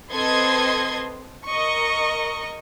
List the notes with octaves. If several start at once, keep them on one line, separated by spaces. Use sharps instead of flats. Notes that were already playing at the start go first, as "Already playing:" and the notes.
C4 A4 B4 D#5 C6 G#6
A#4 D#5 C#6